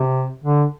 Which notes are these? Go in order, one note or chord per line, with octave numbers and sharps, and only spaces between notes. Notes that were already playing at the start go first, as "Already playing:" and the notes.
Already playing: C3
D3